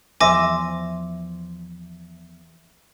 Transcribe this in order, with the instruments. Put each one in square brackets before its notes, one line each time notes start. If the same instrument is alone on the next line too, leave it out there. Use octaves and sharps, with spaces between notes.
[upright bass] E2 F3 [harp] C5 E5 [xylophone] G#5 D6 A#6